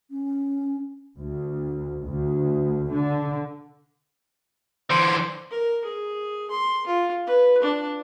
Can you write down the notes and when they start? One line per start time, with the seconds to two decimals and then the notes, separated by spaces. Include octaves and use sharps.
0.11 C#4
1.18 D2
2.05 D2
2.92 D3
4.90 D3 E3 C5
5.51 A#4
5.85 G#4
6.51 C6
6.87 F4
7.27 B4
7.63 D4